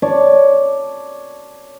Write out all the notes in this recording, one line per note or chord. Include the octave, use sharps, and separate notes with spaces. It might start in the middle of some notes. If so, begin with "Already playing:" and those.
C#5 D5 A5